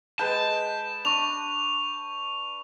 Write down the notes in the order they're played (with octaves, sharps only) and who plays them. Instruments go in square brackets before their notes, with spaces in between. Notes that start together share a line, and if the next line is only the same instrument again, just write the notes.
[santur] G#3 B4 G5 [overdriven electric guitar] A5
[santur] D4 [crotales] C#6 F7